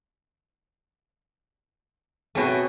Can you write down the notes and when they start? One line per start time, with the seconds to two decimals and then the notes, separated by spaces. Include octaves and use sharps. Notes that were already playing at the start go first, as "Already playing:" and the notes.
2.35 B2 A3 C4 G#4 C#5